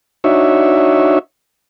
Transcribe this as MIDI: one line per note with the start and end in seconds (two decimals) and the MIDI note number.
0.24 1.19 62
0.24 1.19 63
0.24 1.19 66
0.24 1.19 73
0.24 1.19 76